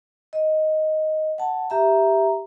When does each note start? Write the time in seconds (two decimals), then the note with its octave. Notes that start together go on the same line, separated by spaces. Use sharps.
0.33 D#5
1.38 F#5 A5
1.70 G4 E5 A#5